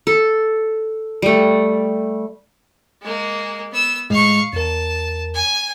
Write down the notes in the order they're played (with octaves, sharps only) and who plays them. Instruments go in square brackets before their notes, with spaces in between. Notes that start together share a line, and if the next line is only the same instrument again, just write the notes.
[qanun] A4
G3 A3
[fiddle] G#3 A#3
B3 E6
[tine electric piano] A2 G#3 [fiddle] F5 C#6
[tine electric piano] E2 A#4 [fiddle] A5
[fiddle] G#5